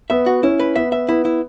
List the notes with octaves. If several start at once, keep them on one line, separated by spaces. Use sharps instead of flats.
B3 E5
F#4
C#4 E4
B4
B3 E5
E5
B3 E4
E4